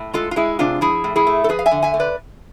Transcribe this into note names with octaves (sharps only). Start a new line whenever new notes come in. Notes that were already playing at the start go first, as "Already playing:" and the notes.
Already playing: A2
G#3 F4 A4
F4
G#3 E4 G#4
C3 D4 F4
F3 E4 G#4
A2
E4 G#4
A3
A4
F3 G#4 B4
F5
E5 G#5
D3
E5 G#5
A3
B4 D5